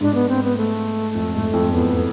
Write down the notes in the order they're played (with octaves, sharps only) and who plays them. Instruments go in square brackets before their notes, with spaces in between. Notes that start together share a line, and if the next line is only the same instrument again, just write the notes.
[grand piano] G#2 [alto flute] D4
[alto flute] B3
C4
B3
A3
[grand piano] F2
G#2
F2
[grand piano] E2 [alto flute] B3